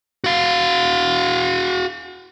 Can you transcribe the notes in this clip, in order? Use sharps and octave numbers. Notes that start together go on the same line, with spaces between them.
F#4 F5